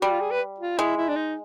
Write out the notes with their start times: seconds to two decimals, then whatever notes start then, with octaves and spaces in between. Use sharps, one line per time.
0.01 G3 F#4
0.11 F4
0.21 G#4
0.31 B4
0.60 F4
0.78 G#3 E4
0.97 E4
1.08 D4
1.16 D#4